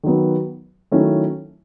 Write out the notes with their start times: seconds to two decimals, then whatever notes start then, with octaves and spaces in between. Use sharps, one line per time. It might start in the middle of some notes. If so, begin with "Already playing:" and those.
0.04 D#3 F#3 B3
0.92 D#3 F#3 A3 C#4 E4